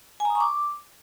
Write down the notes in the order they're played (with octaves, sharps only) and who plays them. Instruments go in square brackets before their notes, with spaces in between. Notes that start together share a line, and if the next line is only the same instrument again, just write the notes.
[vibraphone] G#5
A#5
D#6
C#6
D6